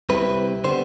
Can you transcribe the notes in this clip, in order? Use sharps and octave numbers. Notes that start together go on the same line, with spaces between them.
C2 C3 G3 C4 E4 B4
D3 G3 B3 C5